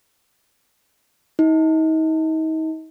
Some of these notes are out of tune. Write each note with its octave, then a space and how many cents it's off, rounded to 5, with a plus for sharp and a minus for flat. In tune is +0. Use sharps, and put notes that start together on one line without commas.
D#4 +35